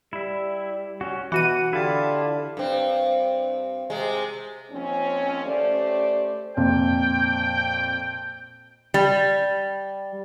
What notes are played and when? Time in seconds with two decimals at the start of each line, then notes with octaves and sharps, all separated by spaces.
0.13 G3 E4 E5
1.01 C#4 F#4
1.32 B2 E3 F#4 F#5 D#7
1.73 D3 E4 F4 G4 F5 A5
2.57 G2 C4
3.90 C3 G#3
4.71 D#2 F3 C4 C#4
5.46 A3 C#4 G4 C5 D5
6.57 F2 A#2 G5
8.94 G3